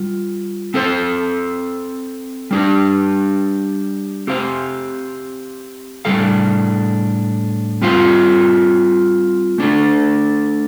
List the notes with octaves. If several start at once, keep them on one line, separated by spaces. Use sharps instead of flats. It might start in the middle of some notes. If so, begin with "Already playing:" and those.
Already playing: G3 F4
C4 A4 C5
G3 D4 G4
C4 G4 C5 F5
A2 G3 D4 A4 F5
G3 C4 F4 C5 F5
A3 D4 A4